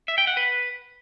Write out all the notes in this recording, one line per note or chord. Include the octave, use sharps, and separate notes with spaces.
E5
G5
F#5
B4